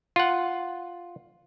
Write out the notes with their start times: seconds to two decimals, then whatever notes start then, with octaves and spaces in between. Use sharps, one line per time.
0.16 F4 F#5